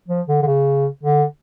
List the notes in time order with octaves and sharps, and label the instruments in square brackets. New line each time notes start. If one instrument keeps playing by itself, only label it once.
[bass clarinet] F3
D3
D3
C#3
D3